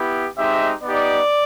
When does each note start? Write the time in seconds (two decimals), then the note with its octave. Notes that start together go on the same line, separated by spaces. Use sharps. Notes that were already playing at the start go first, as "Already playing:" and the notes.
Already playing: B3 E4 G4
0.36 G#3 C4 D#4 G4 E5
0.83 B3 D#4 G4 D5